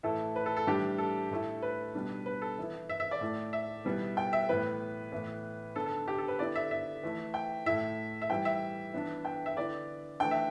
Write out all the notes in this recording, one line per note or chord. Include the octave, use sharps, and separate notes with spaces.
A2 E3 A3 E4 A4
B4
A4
A4
A2 E3 G3 D4 G4
A4
A2 A3 E4
B4
B2 G3 D4
B4
A4
E3 B3 E4
E5
E5
D5
A2 A3 E4
E5
B2 G3 B3 E4
G5
E5
A2 E3 B3 E4 B4
A2 E3 B3
D3 B3 D4 A4
A4
G4
A4
B4
D3 B3 E4 D5
E5
E5
E3 A3 E4
G5
A2 A3 E4 E5
E5
E3 G3 E4 G5
E5
E3 B3 D4
G5
E5
D3 B3 E4 D5
E3 A3 D4 G5
E5